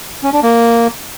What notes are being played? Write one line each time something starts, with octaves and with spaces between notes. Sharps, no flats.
C#4
D4
A#3